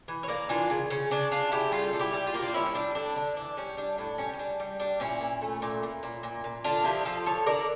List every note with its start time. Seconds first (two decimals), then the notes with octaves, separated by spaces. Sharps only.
0.08 E3
0.23 C#5
0.28 A#3 A#4 D5
0.49 E3 D4 F4
0.70 C#3
0.90 C#3 C#4
1.11 C#3 D4
1.31 C#3 D4 F4
1.52 C#3 E4 G4
1.72 G3 F4 A4
1.93 G3 A4
1.99 E4 G4
2.14 G3
2.27 F4
2.34 A#3 G4
2.42 D4 F4
2.54 G3 C#4 E4
2.66 C#4
2.74 G3 D4
2.95 D3 D4
3.16 D3 D4
3.36 E3 D4
3.57 G3 C#4
3.77 G3 D4
3.98 A2 D4
4.18 G3 C#4
4.34 C#4
4.39 G3 D4
4.60 G3
4.80 G3 D4
5.00 A#2 C#4 E4
5.21 A#2
5.42 A3
5.62 A#2
5.83 A#2
6.03 A#2
6.23 A#2
6.44 A#2
6.64 D3 D4 F4
6.84 F3 E4 G4
7.05 F3 F4 A4
7.26 D3 A4 C#5
7.46 D3 A#4 D5